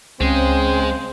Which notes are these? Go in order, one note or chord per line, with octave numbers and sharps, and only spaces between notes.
C#2 C#3 G#3 C4 C#4 C5